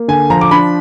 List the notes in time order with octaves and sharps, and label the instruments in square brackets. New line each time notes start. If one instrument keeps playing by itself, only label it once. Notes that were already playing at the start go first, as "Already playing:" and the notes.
Already playing: [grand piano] A#3
D3 G#5
F3 A#5
D6
D4 B5